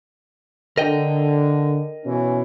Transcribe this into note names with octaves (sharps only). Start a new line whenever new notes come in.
D3 A#4 D#5 G5
B2 E3 C#4